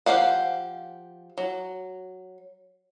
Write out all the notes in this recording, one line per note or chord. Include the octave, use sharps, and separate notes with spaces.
F3 D#4 G4 F5 F#5
F#3